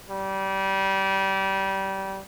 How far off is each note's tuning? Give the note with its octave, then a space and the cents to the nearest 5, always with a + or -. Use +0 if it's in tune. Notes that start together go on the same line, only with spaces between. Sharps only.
G3 -20